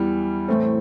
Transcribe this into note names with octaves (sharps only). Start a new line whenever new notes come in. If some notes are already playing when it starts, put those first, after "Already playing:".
Already playing: E2 E3 G3
A2 E3 A3 C4